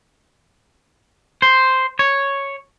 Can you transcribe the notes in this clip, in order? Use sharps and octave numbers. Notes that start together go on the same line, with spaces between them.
C5
C#5